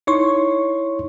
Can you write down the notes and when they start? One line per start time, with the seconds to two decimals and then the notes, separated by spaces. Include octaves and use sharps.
0.07 D#4 E4 C#5 C6 C#6